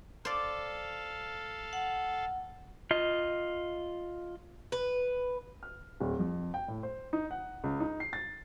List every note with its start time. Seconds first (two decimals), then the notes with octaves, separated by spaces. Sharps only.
0.25 A4 C5 D5 F5
1.73 F#5
2.91 F4 D#5
4.72 B4
5.63 F6
6.00 D1
6.19 F2
6.54 G5
6.68 A2
6.83 C5
7.13 D#4
7.31 F#5
7.64 C#2
7.80 D#4
8.00 C7
8.13 A6